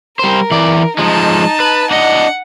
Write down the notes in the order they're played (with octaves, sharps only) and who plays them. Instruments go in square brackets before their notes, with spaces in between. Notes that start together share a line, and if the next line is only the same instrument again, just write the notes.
[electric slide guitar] G3 C5 [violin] A#4
[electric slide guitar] E3 D5
[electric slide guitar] F3 G#3 [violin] D#4 A5
[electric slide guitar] B4
[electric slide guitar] D4 D#5 [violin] F#5